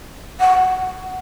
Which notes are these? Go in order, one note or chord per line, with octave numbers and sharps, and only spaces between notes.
F#5